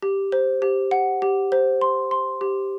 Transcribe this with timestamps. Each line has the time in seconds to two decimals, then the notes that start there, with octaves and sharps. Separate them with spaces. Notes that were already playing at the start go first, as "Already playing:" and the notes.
0.03 G4
0.32 C5
0.62 G4
0.91 F#5
1.22 G4
1.52 C5
1.81 C6
2.11 C6
2.41 G4